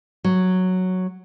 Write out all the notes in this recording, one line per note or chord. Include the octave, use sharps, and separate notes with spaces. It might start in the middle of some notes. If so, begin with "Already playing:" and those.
F#3